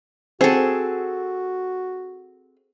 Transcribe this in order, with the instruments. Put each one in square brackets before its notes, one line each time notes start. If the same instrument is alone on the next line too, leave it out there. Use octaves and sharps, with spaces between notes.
[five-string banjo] C4 [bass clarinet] F#4 [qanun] G#4 A4